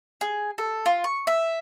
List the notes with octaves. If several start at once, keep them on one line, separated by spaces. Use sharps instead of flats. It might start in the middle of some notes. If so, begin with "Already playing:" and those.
G#4
A4
F4
C#6
E5